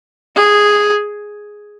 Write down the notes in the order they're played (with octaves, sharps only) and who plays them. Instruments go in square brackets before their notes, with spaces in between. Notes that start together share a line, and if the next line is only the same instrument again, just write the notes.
[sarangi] G#4